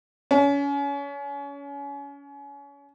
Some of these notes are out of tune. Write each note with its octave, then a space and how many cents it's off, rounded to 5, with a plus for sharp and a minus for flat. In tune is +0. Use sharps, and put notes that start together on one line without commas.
C#4 +30